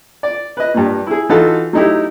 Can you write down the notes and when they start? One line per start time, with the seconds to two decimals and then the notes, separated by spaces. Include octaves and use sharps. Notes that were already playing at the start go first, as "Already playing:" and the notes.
0.23 D5
0.57 B4 D#5
0.74 G2 A#2
1.07 E4 G#4
1.29 E3 D#4 F4 F#4 A4
1.73 F#3 A3 D#4 E4 G4